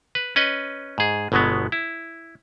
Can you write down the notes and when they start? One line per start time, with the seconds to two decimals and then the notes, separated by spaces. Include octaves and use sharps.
0.15 B4
0.36 C#4 B4 D#5
0.98 G#2 G#4
1.32 G1 B2 F#3 G#3 B3
1.72 E4